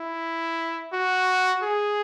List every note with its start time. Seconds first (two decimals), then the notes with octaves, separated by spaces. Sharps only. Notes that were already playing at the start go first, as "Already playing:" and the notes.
Already playing: E4
0.93 F#4
1.63 G#4